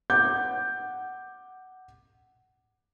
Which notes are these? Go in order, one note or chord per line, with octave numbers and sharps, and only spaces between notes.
F#5 D6 G6